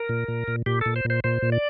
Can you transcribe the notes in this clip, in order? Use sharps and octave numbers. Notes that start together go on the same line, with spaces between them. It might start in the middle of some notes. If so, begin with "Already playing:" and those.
Already playing: A#4
A#2
A#2
A#2
A#2 G4
A#2 A4
C5
A#2
C5
A#2 C5
A#2
D5